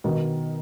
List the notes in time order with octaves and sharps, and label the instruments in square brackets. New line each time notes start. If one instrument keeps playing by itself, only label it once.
[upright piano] B2 D#3